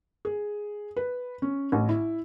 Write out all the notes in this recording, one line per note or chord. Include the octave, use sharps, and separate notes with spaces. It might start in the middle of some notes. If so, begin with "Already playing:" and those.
G#4
B4
C#4
A1
E4